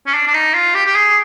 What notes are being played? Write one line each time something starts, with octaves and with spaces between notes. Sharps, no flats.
C#4
D4
D4
D#4
F4
G4
G4
G#4